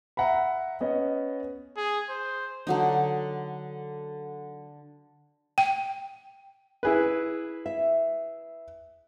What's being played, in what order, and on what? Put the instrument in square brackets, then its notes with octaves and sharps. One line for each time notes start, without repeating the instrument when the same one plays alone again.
[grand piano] E5 F#5 A#5 B5
B3 C#4 D#5
[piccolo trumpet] G#4
C5
[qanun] D3 F#3 D#4
[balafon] G5
[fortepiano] E4 G#4 B4
[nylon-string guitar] E5